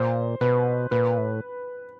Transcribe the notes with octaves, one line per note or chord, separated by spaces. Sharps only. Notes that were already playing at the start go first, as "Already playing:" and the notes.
Already playing: A#2 C5
B2 B4
A#2 B4
A2